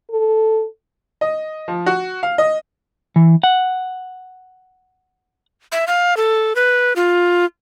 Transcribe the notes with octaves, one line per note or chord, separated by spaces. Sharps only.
A4
D#5
F3
F#4
F5
D#5
E3
F#5
E5
F5
A4
B4
F4